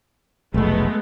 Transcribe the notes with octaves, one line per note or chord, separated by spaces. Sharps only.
F1 B1 G#3 A3 B3